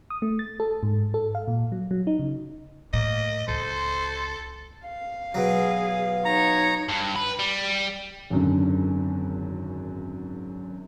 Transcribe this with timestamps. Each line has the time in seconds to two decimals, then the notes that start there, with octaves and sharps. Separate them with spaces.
0.10 D#6
0.22 A3
0.39 A6
0.60 A4
0.83 G#2
1.14 A4
1.35 F5
1.48 A#2
1.72 F#3
1.91 F#3
2.07 D#4
2.19 C#3
2.93 A2 A#3 D#5
3.48 C#2 A4 C5
4.84 F5
5.35 B2 F#3 G#4
6.25 D#4 C#5 A#5
6.88 G2
7.16 B4
7.39 G3
8.30 G#1 F#2 D3